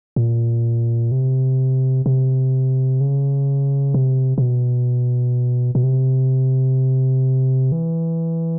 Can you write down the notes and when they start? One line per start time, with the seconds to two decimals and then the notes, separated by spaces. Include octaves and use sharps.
0.16 A#2
1.12 C3
2.06 C3
3.01 C#3
3.94 C3
4.38 C3
4.42 B2
5.75 B2
5.83 C3
7.72 E3